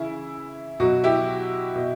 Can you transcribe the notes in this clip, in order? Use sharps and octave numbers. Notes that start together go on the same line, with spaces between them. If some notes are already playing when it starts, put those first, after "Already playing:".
Already playing: C#3 E3 E4
B2 F#3 F#4
E4 G4
B2